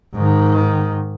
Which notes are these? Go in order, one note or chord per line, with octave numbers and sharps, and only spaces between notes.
G#2 D#3